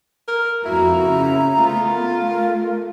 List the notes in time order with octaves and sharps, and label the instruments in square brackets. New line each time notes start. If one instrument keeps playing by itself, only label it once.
[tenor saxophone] A#4
[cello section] F2 A#3 F#4 [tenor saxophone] E4 [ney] A#5
[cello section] C#3
[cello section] A3 B3 [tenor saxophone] F4
[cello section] A3 [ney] A#4